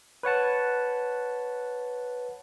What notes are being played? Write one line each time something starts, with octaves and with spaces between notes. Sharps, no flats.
B4 C#5 F#5 A5